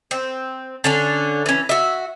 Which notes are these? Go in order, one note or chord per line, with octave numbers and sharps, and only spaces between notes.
C4
D3 C#4 D4
E3 C#4
F#4 E5